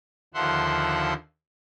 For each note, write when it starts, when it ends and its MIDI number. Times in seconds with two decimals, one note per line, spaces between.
0.34 1.14 39
0.34 1.14 50
0.34 1.14 53
0.34 1.14 76
0.34 1.14 78
0.34 1.14 84